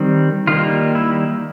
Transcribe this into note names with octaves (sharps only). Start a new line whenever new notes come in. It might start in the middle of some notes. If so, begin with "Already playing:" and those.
Already playing: D#3 G3 C4
D#3 G3 A#3 F4
E4